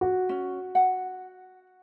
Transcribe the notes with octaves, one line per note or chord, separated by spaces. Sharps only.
F#4
C#4
F#5